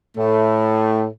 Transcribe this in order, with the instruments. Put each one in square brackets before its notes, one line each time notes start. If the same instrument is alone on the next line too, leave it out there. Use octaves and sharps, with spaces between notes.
[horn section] A2 A3